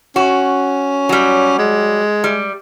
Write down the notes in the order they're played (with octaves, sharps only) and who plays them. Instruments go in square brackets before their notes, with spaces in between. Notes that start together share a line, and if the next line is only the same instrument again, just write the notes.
[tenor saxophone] C#4 [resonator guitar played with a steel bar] F#4
[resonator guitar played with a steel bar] F#3 G3
[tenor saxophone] G#3
[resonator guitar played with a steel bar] G3